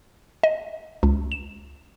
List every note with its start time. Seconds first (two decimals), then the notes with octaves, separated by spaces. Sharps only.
0.43 D#5
1.03 C#2
1.32 E7